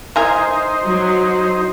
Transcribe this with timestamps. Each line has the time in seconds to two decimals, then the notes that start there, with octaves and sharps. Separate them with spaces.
0.16 E3 D#4 A#4 C5 G#5
0.86 F#3